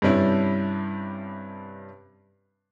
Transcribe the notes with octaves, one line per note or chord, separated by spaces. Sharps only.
G2 C3 G3 C#4 D4 E4